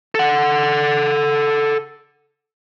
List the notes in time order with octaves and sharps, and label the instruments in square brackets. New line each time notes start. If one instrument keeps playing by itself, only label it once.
[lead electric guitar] A4 F#5